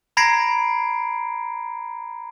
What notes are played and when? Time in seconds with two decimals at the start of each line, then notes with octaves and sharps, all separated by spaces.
0.17 A#5 B5 G#6 A#6 C7 D7